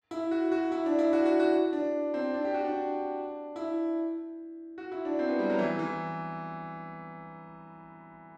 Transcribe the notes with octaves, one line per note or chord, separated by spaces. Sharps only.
E4
F#4
F#4
E4
D4
E4
F#4
F#4
F#4
D4
C4
D4
G4
F#4
D4
E4
F#4
E4
D4
C4
B3
G3
F#3
E3
E3